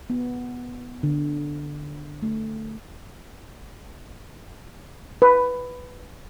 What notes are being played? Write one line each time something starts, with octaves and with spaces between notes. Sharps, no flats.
B3
D3
A3
B4